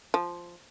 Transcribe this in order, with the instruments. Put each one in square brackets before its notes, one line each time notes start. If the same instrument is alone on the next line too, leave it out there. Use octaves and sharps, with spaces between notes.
[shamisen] F3